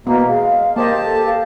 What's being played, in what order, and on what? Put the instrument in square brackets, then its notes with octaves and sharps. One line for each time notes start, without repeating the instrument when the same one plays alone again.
[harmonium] B2 A#3 [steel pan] B3 [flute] E5
[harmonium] G#3 [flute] F5
[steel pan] A#3 C5 D#5 [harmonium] G4 A5
[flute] A4
F5